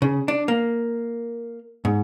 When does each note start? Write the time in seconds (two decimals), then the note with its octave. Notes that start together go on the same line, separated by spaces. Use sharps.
0.02 C#3
0.28 D4
0.48 A#3
1.85 G#2